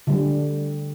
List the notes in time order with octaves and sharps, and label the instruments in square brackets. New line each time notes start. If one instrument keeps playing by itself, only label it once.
[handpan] D3 G3